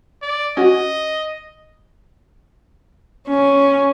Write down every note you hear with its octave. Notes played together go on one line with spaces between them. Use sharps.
D5
C#4 F#4 D#5
C#4